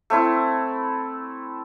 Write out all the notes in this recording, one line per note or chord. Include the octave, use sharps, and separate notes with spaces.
A3 C4 E4